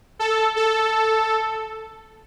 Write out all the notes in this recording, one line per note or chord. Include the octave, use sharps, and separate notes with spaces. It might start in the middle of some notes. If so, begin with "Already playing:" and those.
A4
A4